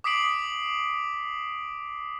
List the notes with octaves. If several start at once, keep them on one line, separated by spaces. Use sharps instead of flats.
D6 D#6 B6 C7 D7 F#7